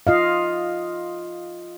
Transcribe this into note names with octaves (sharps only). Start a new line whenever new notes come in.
F4 D#5 F5